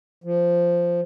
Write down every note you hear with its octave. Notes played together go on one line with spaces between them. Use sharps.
F3